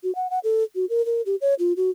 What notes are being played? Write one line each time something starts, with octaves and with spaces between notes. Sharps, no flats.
F#4
F#5
F#5
A4
F#4
A#4
A#4
G4
C#5
F4
F#4